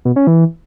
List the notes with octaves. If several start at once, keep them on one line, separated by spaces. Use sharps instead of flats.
B2
C#4
E3